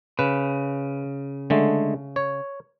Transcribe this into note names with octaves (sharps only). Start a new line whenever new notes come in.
C#3 B4
D3 G#3 A3
C#5